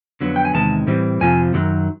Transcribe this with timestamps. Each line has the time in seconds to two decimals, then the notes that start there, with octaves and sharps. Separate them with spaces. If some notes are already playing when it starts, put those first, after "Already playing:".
0.21 F2 D3 F#3 B3
0.36 G5
0.45 G#5
0.54 E2 C3 D#3 G#3 A5
0.87 A2 E3 G3 C4
1.21 F2 C3 F3 A3 G#5
1.54 F#2 D#3 F#3